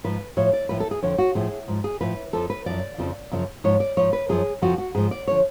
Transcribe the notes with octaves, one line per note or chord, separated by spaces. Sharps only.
G#2 F3 B4
A2 F3 C#5
D5
A2 F3 B4
A4
G#4
F2 D3 F3 C#5
F#4
A2 F3 G#4
G#2 F3
G#4
A2 F3 B4
F2 F3 A4
B4
F#2 C#3 F3 D5
F2 C#3 F3
F#2 C#3 F3
G#2 F3 C#5
D5
G#2 F3 C#5
B4
F#2 F3 G#4
F2 C#3 F3 F#4
F#4
G#2 F3 G#4
D5
D3 F3 C#5